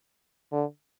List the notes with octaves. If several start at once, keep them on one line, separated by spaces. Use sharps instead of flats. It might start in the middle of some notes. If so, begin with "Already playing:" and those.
D3